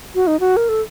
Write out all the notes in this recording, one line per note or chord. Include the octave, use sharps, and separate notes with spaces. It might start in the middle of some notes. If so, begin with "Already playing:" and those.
F#4
D#4
F#4
A#4
A4